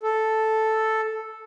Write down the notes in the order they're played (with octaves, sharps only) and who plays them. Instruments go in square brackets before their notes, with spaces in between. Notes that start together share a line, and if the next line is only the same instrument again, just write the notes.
[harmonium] A4